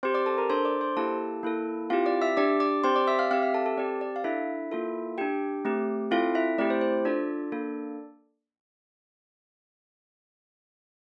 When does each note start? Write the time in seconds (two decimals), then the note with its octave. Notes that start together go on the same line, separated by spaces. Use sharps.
0.03 C4 G4 C5 C6
0.14 D5 D6
0.26 A4 A5
0.38 A#4 A#5
0.50 D4 A4 C5 C6
0.65 D5 D6
0.81 C5 C6
0.96 A#3 E4 G4 A4 A5
1.43 A#3 E4 A4
1.90 C4 E4 F4 G4 F5
2.06 D5 D6
2.22 E5 E6
2.37 D4 G4 D5 D6
2.60 D5 D6
2.84 C4 G4 C5 C6
2.96 D5 D6
3.07 E5 E6
3.19 F5 F6
3.31 C4 G4 F5 F6
3.42 E5 E6
3.54 A4 A5
3.66 A4 A5
3.77 C4 G4 D5
4.01 D5
4.16 F5
4.24 D4 E4 A4 E5
4.71 A#3 F4 A4
5.18 D4 G4 G5
5.65 A3 C4 G4
6.11 C4 E4 F4 A4 F5
6.35 E4 E5
6.58 A3 C4 E4 G4 D5
6.70 C5
6.81 C5
7.05 D4 F4 A4 D5
7.52 A#3 D4 A4